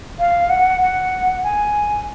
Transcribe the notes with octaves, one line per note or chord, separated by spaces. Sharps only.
F5
F#5
F#5
G#5